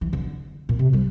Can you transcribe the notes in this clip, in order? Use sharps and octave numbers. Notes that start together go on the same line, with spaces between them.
E3
D3
A#2
C3
G3